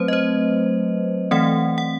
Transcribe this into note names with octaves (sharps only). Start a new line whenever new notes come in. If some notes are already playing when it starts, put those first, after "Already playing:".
Already playing: F#3 A3 C4 B4 C5
D#5
C5
E3 A3 C4 F#5
F#5